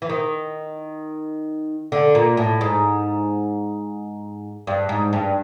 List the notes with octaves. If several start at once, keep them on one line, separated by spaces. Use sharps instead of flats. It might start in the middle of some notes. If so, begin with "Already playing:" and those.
E3
D#3
D3
A#2
A2
G#2
G2
G#2
G2